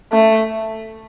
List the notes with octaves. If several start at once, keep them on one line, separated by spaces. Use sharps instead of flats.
A3